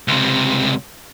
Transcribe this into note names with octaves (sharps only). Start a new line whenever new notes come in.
C#2 C3